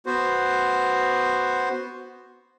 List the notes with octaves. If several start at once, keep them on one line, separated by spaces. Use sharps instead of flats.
B3 F#4 C5